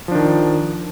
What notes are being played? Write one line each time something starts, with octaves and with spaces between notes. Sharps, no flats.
D#3 F3 D4